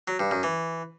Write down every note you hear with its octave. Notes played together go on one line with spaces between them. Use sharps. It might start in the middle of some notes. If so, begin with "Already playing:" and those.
F#3
G2
F#2
E3